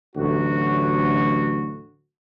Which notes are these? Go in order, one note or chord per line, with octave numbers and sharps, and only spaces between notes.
A1 D2 F#3 F#4